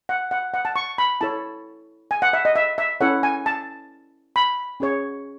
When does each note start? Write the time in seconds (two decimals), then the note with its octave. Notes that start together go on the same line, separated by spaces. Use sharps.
0.09 F#5
0.31 F#5
0.54 F#5
0.65 A5
0.76 C#6
0.98 B5
1.21 E4 A4 C#5 A5
2.11 G#5
2.22 F#5
2.33 E5
2.45 D#5
2.56 E5
2.78 E5
3.01 C#4 E4 A4 C#5 F#5
3.23 G#5
3.46 A5
4.36 B5
4.80 C#4 G#4 C#5